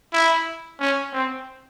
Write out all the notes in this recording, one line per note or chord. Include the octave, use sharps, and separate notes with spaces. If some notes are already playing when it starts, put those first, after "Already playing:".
E4
C#4
C4